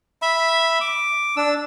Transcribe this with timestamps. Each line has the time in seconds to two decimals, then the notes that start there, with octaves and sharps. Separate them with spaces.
0.22 E5 B5
0.81 D6
1.37 D4 E6